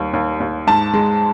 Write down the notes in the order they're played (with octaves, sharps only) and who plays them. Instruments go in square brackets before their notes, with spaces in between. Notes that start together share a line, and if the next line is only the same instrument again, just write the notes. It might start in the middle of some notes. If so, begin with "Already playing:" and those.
Already playing: [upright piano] D#2 G3
D#2
D#2
[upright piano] G#2 [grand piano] A5
[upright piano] G#3